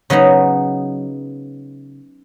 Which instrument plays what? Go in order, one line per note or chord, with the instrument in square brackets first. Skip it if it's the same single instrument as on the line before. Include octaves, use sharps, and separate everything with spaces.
[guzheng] C#3 F#3 B3 D#4 D#5